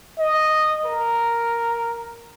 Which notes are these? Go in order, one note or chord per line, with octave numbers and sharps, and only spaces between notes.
D#5
A#4